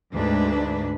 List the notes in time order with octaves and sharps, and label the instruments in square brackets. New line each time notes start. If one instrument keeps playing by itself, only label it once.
[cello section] D2 G#2 D4 B4